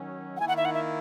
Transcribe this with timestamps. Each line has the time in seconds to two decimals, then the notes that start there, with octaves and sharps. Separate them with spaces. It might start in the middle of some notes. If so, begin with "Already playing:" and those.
Already playing: D#3 F#3 C#4
0.37 F#5
0.40 D#3 A#3 E4 G#5
0.48 F#5
0.57 E5
0.65 F#5
0.74 E5